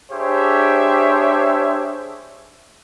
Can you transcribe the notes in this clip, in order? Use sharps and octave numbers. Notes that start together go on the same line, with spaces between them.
D4 G4 G#4 C5 C#5 E5